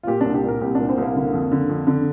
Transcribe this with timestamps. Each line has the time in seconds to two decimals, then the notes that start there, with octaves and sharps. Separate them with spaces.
0.03 F4
0.07 A#2 G4
0.21 D4
0.25 C2
0.34 G4
0.44 A#2 A#4
0.61 C2 G4
0.75 D4
0.79 A#2
0.89 C4
0.98 C2 A#3
1.16 D3
1.33 F2
1.52 D3
1.69 F2
1.87 D3